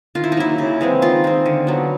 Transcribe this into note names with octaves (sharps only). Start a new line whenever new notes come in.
D#3 F4
E4
D#4
F#3 A#3 E4
C#3
E3 G#3 C4
D#3 F4
G#3 C4
D3
F#3 B3